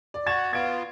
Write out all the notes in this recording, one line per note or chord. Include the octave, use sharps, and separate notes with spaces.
D5
F#4 G#6 A6 E7
B3 F4 G#6 D7